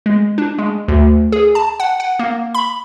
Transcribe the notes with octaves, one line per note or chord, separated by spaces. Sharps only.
G#3
D4
G#3
D2
G#4
A5
F#5
F#5
A#3
B5